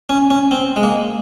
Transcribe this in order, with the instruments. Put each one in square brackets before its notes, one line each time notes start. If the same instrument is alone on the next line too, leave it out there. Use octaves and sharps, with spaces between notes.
[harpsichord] C#4
C#4
C4
G#3
A#3